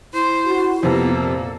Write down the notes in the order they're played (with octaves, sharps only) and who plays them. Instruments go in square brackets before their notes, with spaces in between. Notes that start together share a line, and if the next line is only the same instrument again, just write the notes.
[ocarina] E4 [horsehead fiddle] C5
[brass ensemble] F#4
[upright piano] F2 C3 [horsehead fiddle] A#3 A4 [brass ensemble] B3
[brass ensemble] A#2